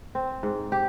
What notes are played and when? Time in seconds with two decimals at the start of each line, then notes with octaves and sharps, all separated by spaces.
0.15 C4
0.43 G#2
0.72 G4